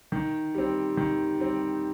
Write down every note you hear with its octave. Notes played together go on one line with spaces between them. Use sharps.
D#3
G3 C4
D#3
G3 C4